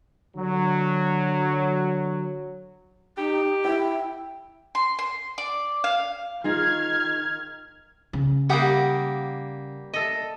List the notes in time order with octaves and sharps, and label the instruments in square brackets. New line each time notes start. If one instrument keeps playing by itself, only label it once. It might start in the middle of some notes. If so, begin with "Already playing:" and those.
[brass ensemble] D3 F#3
[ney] D#4 [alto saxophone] G4
[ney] E4 [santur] G5
[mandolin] C6
C6
D5
F5
[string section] D#3 F6 G#6 [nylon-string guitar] D#4 F4 G#4
[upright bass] C#3
[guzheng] G3 A#3 [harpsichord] G4 [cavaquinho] F#5 D#6
[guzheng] A4 D#5